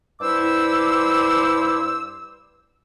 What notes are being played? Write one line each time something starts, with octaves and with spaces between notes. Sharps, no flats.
G2 E4 C5 D6 E6